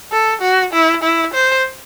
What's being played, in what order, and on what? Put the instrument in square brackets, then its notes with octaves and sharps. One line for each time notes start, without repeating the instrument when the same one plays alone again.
[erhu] A4
F#4
E4
E4
C5